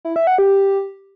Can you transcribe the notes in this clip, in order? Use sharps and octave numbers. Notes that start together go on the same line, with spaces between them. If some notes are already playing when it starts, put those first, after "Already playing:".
E4
E5
F#5
G4